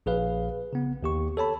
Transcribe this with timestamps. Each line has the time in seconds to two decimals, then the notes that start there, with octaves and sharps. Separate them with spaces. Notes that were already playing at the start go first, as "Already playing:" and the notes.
0.06 A#1 G#4 B4 F5
0.73 C#3 B3
1.03 D#2 G4 C#6
1.37 A4 C#5 A5 B5